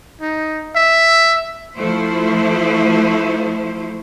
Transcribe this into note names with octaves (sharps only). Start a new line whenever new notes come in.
D#4
E5
F3 A3 E4 C5